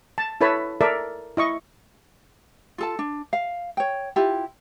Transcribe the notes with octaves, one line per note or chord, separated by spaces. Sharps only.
A5
E4 A4 B4 C#5 A5 B5
A4 A#4 D5 E5
E4 D#5 C#6
F4 A4 A5
D4
F5
C#5 G5
E4 F4 G4